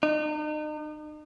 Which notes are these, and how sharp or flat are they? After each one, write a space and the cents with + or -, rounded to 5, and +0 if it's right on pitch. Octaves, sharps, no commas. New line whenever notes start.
D#4 -40